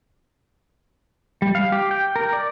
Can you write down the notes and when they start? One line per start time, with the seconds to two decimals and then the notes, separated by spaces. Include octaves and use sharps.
1.42 G3
1.55 F5
1.72 G4
1.91 G5
2.16 A#4
2.33 D5